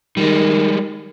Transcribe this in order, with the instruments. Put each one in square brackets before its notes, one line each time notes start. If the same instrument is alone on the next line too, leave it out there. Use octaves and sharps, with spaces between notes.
[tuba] D#3 [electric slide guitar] G3 G#3